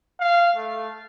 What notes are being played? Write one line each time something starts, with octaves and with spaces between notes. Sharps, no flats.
F5
A3